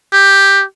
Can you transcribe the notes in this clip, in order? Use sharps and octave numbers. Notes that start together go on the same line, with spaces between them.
G4